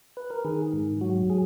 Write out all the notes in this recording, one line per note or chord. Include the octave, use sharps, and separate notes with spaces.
B4
A#4
D#3 G#4
G#2
F#3 F#4
G#4